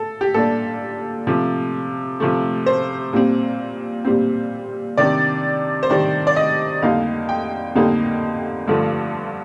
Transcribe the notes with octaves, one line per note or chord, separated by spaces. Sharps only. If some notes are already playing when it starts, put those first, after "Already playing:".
Already playing: A4
G4
A#2 G3 D4 A4
C3 F3 A3
C3 F3 A3
C5
A#2 G3 C4
A#2 G3 C4
C3 D#3 G3 D4 D5
C5
C3 D#3 G3 D4 D5
D5
D#5
F2 D3 G3 A#3 D#4 F5
G5
F2 D3 G3 A#3 D#4
G2 D3 F3 A3